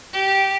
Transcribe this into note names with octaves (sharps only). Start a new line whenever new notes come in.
G4